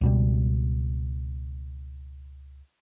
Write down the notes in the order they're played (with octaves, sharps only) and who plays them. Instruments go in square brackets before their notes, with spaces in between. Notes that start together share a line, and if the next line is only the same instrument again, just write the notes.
[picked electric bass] C#2 B2 G3